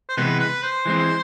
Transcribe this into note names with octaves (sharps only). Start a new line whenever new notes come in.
C5
C3 E3 G#3 B3 B4
B4
C5
E3 G#3 C4